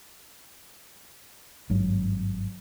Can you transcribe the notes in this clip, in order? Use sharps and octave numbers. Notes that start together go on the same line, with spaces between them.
G#1 G2 F#3